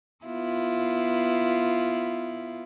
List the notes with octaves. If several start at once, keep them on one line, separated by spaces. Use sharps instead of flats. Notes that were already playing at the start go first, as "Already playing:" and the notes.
B3 E4 F4